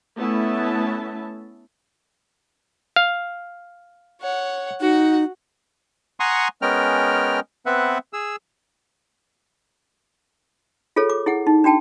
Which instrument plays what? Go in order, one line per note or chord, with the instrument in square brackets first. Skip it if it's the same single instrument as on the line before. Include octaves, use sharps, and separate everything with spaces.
[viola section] A3 B3 C#4 E4 E5 A5
[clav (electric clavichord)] F5
[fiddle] C#5 F#5
[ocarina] D#4 [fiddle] F#4 F#5
[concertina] F#5 G#5 A#5 C6 C#6 D#6
G#3 B3 C#4 A#4 G5 F6
B3 C4 B4 E5 F#5
G#4 E6
[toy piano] F4 G#4 A4 C#5
D6
E4 G#4 F#5
D#4
D4 F#4 G5 A5